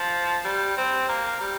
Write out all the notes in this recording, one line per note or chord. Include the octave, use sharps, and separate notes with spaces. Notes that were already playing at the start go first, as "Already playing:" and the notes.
Already playing: F3
G3
C4
A#3
G3